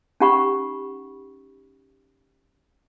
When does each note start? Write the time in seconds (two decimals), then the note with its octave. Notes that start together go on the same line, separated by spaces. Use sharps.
0.20 C#4 D#4 G4 F#5 B5 C#6